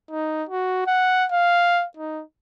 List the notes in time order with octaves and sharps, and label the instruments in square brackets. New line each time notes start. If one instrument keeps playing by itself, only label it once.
[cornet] D#4
F#4
F#5
F5
D#4